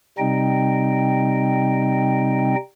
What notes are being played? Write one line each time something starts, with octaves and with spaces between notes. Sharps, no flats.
C3 G3 C4 D#4 D#5 G5